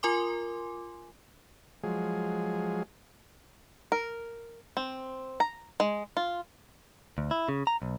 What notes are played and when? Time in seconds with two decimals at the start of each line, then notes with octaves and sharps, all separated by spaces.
0.03 F4 A#4 G#5 C6 D6
1.83 F3 F#3 G#3 G#4
3.92 A#4
4.77 C4
5.40 A#5
5.80 G#3
6.17 F4
7.18 D2
7.31 E4
7.49 C#3
7.67 A#5
7.82 B1